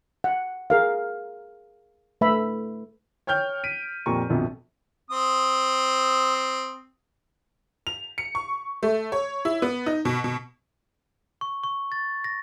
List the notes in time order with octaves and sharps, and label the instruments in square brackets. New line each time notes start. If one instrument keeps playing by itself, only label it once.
[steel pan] F#5
G#4 A#4 F5
A3 B4 E5 B5
[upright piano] C#5 G5 F6 G6
B6 D7 D#7
F2 A#2 G4 A#5 C#6
A#1 F2 B2
[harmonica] C4 D#6
[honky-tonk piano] F7
C#7
C#6
A3
C#5
E4
B3
D#4
B2
B2
[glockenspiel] C#6
C#6
A6
A#6